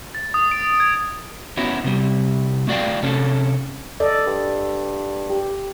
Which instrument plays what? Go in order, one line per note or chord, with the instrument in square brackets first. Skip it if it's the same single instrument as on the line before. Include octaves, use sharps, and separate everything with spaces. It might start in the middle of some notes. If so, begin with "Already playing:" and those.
[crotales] A6
D#6
D7
G#6
[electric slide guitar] B3 C#4 E4 F#4
C3 G3
A3 F#4 D5 F5 G5
C3 C#4 A4
[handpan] A4 D5 D#5
[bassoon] G2
[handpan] G4